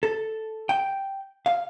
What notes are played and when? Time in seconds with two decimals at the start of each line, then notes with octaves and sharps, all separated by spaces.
0.03 A4
0.69 G5
1.46 F5